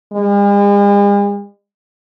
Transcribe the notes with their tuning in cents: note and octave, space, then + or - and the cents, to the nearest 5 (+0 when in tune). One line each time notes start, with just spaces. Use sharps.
G#3 -45